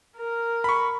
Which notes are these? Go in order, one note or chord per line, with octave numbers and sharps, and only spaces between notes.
A#4
B5 C#6